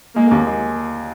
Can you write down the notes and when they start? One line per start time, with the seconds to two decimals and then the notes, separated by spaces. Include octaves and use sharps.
0.16 G#3 A#3
0.31 D#2
0.46 G#3